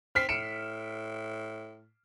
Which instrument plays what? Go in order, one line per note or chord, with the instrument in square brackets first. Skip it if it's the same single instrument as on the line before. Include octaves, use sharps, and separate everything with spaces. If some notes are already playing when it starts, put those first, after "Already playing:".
[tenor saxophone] C4 [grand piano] F6 B6 C7
[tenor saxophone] A2 [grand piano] C#7 D7 E7